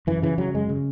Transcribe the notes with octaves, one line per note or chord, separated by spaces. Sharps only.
F#2 E3
C#3 E3
C#3 F#3
F#2 G#3
C#3